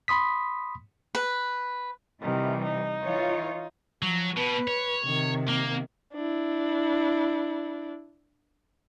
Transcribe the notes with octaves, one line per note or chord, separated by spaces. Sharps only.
B5 C6 D#6 B6
B4
C3 D#3 E3 G3
D#4
E3 F4 C#5
F3 F#3
B2 B4
C#5
C3 D#3
A#3
D4 E4